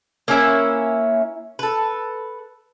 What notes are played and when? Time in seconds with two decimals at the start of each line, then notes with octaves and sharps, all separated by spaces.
0.28 A#3 C#4 E4 E5
1.59 A4 B4